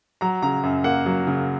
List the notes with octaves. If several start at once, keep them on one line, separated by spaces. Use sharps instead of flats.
F#3 A#5
C#3 A#5
F#2
A#3 F#5
F#3
C#3